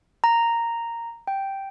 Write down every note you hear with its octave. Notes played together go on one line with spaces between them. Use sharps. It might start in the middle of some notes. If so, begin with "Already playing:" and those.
A#5
G5